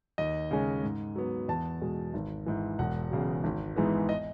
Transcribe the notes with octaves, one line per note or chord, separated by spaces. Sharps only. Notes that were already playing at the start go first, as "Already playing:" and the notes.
D#2 D#5
C#3 G#3 C#4
G#2
F#3 B3
E2 A5
B2 G#3
G#1
G#2 E3
E1 F#5
E2 C#3 F#3
G#1
G#2 E3 G#3 B3
D#5